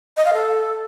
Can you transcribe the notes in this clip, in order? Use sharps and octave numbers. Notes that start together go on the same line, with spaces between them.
D#5
F5
A4